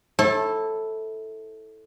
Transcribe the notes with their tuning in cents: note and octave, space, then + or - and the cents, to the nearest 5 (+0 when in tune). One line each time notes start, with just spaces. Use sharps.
E4 -20 A4 +0 C#5 -40